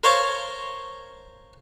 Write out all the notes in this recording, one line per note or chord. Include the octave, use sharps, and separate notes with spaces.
A#4 C5 C#5 F5 A5 A#5